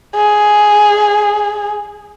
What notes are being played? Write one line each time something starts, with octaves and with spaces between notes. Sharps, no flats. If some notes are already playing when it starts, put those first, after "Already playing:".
G#4